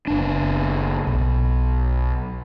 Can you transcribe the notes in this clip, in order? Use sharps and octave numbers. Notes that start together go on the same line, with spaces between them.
F#1 D4
B1